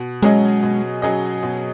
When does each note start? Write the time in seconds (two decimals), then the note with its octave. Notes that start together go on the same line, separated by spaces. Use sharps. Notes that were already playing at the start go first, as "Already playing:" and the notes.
Already playing: B2
0.22 F#3 G#3 C#4 G#4 D#5
0.63 B2
1.02 F#3 C#4 G#4 D#5
1.43 B2